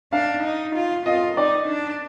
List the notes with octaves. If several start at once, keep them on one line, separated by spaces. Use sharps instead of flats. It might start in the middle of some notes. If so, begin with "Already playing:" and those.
D4 F5
D#4
F4
F4 D#5
D#4 D5
D4